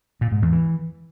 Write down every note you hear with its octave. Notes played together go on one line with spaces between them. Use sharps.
A#2
G#2
E2
E3